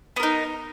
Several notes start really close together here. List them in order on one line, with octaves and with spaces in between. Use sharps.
B3 A#4 D#4